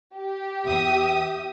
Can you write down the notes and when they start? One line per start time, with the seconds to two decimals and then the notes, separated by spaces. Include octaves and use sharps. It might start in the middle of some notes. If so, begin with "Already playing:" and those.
0.16 G4
0.63 E2 E5 D#6